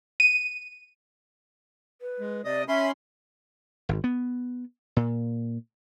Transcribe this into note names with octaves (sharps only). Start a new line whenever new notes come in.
D#7
B4
G#3
C3 D5 D#5 D#6
C#4 E5 B5 C6
G#1
B3
A#2